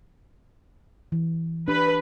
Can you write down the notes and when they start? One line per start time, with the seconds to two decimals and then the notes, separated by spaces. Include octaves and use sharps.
1.12 E3
1.68 D4 G4 B4